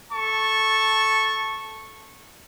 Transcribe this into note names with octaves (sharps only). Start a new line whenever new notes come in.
A4 A5 C#6